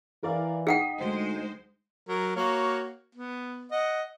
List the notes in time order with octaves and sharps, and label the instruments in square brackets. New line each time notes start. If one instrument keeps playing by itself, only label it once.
[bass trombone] E3 [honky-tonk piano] A#4 D5 F5
[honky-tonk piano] D#4 D#6 B6 [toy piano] G#4 F#5 G5
[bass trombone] D2 [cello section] G#3 C5
[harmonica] F#3 A#4
A#3 F#4 C#5
B3
D#5 F#5